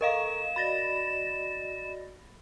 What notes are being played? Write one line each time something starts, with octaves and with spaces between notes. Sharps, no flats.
A4 A#4 D#5 F5 A#5 C#6 E7
F#4 D5 D#5 B5 A6 A#6